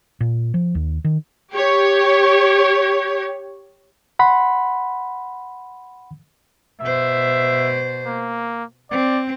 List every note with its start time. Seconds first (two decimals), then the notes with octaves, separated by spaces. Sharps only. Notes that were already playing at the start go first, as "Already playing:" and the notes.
0.20 A#2
0.54 F3
0.75 D#2
1.04 D#3
1.51 G4 C#5
4.19 F#5 B5 C6
6.81 B2 C5 E5
8.06 A#3
8.91 C4 D5